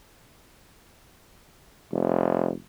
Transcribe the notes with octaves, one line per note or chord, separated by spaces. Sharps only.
F1